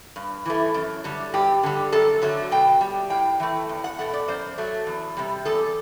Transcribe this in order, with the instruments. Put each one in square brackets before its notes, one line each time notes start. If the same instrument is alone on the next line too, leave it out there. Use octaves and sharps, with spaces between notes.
[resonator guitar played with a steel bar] G2
E3 A3
F#2
D3 G3
G2 G4
D3 G3
F#2 A4
D3 F#3 A3
B2 G5
G3
A2 G5
E3 A3
E2
F#5
B2 A3 F#5
D5
F#2 C5
F#3 A3
E2
C3 G3
E2 A4